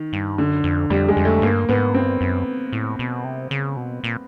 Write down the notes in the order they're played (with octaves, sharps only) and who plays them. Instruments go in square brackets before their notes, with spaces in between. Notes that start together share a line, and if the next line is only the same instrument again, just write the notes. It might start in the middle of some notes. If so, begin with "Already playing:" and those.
Already playing: [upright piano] D#3
[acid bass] G2
[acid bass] F#2 [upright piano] D3
[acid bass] F2
[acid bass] F2 [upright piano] G3
[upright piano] G#3
[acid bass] F2
[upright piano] A3
[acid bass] G2 [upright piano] A#3
[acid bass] G#2 [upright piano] B3
[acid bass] G2 [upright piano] C4
[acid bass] F#2
A2
B2
C3
C#3
B2
A#2